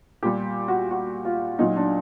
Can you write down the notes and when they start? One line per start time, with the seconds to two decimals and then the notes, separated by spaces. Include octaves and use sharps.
0.23 A#2 G3 G4
0.68 F#4
0.91 F#4
1.25 F4
1.59 A#2 F#3 D#4
1.77 D4